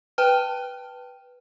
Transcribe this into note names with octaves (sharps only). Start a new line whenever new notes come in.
B4 G5 A5 F6